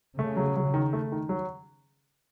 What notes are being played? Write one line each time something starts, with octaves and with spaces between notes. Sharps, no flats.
C#3 A3
F#3
F#3
D#3
A3
D#3
F#3